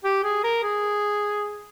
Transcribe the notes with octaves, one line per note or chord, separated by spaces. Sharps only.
G4
G#4
A#4
G#4